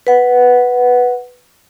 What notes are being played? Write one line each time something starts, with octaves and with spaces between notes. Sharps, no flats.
B4 F#5